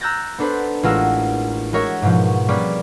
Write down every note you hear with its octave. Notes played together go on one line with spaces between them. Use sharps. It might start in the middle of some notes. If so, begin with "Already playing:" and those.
A#5 E6 F#6 G6 A6 A#6
B3 D4 A4 B4 C5
A1 G#3 F4 A#4 F#5 E6
G#3 F#4 A#4 C#5 E5
G#2 B2 F3
G3 A#3 C#4 G#4 B4 D5